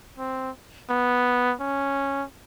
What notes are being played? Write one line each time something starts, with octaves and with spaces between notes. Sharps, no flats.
C4
B3
C#4